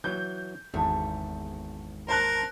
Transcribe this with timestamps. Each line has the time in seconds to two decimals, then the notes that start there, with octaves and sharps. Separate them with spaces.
0.04 E3 F#3 G6
0.74 G#1 E2 G#2 A3
2.08 A#4 C5 A5 F#6